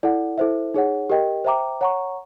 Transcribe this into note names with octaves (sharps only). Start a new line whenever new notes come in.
E4 A4 D5 F#5
E4 A4 C5 E5
D#4 G#4 C#5 F#5
G4 A#4 D#5 G5
C5 E5 G5 A#5 D6
C#5 F#5 A#5 C#6